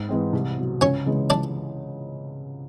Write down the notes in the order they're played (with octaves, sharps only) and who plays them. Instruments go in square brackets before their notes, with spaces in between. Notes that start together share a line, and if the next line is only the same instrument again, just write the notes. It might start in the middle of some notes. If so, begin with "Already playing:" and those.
Already playing: [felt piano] G#2
E3 G#3 C4
C2
B2 F#3
[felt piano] C#2 [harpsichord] C#4 C#5
[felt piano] C#3 E3 G#3
[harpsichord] D4 D5